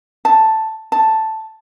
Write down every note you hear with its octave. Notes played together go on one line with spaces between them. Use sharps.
A5
A5